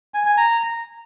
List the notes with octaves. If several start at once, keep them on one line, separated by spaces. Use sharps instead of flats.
G#5
G#5
A#5